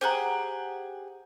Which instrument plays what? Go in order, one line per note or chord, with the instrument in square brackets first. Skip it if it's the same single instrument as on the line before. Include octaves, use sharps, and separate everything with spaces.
[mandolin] G4 G#4 F#5 [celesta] C5 A#5